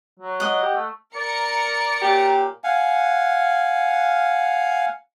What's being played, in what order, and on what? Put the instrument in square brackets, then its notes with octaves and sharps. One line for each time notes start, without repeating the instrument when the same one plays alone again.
[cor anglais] F#3
[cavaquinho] D#5 F#5
[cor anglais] G4
A3
[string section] A#4 C#7 [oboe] D5
[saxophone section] A#2 F#3 G4
[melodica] F5 F#5 G#5